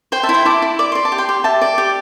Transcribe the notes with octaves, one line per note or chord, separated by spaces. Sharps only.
C5 G5 C6
E5 A5
E4
G5 C6
E4 A5 D6
E4
D5 D6
D5 C6
A5
G4
G5 C6
G4
G4 E5 A5
D5
G4